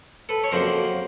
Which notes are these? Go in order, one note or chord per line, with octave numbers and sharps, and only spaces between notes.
A4 B4
C#5
F2 C#3 F#3 A#3 A#4 C5